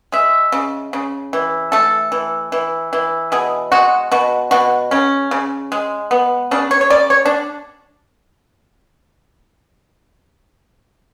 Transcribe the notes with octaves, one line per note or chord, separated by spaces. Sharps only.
G#3 E5
C#3
C#3
E3
A3 A4
E3
E3
E3
B2 G#4
G#3 F#4
B2 F#4
B2 F#4
C#3 C#4
C#3
G#3
B3
C#3 D4
C#5
C#5
C#3 D5
C#5
D4